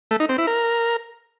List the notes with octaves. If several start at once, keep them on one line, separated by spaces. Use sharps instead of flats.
A3
D#4
C4
E4
A#4